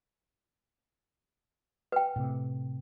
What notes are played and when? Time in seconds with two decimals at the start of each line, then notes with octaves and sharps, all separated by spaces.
1.92 B4 G5
2.16 A2 C3